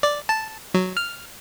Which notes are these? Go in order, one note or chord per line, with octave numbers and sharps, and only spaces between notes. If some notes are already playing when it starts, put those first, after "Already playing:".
D5
A5
F#3
F6